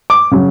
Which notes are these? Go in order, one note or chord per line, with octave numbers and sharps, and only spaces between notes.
D6
C#3 F#3